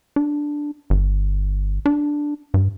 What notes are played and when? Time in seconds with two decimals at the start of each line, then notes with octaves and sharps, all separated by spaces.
0.16 D4
0.90 G1
1.86 D4
2.54 G2